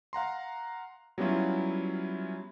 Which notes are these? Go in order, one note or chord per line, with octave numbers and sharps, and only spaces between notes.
F5 F#5 A#5 C6
F#3 G3 B3 C#4 E4 F4